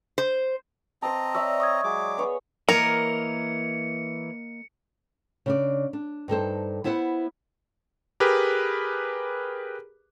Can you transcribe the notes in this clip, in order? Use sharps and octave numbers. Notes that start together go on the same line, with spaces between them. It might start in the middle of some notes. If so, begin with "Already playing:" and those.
C5
C4 C5 D#5 A5 A#5 D6
C#5 D5 E5 E6
C#6 D#6 G#6
F#3 G#3 D6
B3 G#4 C#5
E3 A#3 A#4 C#5 D#5 A#5 C#7
C#3 D4 D5
D4
G2 D#4 A4 C5
B3 E4 C5 E5 F#5
G4 G#4 A#4 B4